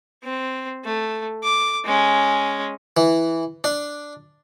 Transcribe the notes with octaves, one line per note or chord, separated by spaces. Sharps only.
C4
A3
D6
G#3 C#4
E3
D4